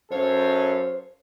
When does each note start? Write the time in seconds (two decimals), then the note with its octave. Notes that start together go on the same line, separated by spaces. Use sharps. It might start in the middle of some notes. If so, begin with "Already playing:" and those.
0.11 F#2 A4 C5 C#5 F5